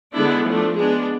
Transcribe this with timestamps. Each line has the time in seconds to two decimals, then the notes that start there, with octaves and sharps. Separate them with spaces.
0.12 D3 G#3 B3 D4 E4
0.44 F3 A3 D4
0.75 G#3 B3 D4 G#4